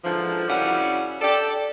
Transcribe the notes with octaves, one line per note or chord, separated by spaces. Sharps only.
G#2 D3 E3 F3
F#2 C#3 G3 C#4 E4 F#5
G4 A4 D5